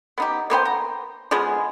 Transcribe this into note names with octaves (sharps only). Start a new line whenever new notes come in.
B3 D#4 G4
A#3 B3 C5 G5
A#5
F3 G#3 B3 G#4